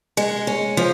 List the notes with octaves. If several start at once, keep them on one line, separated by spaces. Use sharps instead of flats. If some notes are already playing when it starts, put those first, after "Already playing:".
G#3
C#4
F3